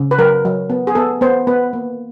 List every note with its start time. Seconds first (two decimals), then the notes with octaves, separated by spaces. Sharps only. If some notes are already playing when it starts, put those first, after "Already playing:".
Already playing: C#3
0.11 B4
0.18 F#3 A#4
0.45 F#3
0.70 B3
0.87 G#4
0.95 B3 A4
1.21 B3 C5
1.47 B3 B4
1.73 A#3